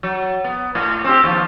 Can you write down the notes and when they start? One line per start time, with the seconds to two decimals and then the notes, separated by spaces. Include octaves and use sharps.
0.03 F#3
0.44 B3
0.75 A2
1.04 C4 C#4 G4
1.24 D#2 F3